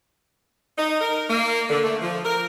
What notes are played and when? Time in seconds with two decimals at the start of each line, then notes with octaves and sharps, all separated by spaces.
0.78 D#4
1.01 A#4
1.29 A#3
1.70 D3
1.84 A3
2.02 F3
2.25 A#4